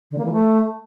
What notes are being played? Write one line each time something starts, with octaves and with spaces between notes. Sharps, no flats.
D3
A#3
E3
A3